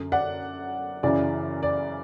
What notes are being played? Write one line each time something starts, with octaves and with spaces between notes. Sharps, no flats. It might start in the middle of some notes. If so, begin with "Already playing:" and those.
Already playing: F#2 D3
D5 F#5
F#2 C#3 E3 D5
D5